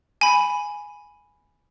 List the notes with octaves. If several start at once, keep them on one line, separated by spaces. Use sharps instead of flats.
G#5 B5